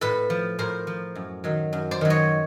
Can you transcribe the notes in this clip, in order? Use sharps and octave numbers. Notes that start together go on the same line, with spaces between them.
A2 A4 B4
F3
A2 A#4 C5
F3
F#2
D#3 F#3
F#2
C5 D5
D#3 F#3
C#5 D#5